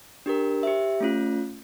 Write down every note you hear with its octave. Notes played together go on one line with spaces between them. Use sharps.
D4 G4 A#4
G4 C5 E5
A3 C#4 F4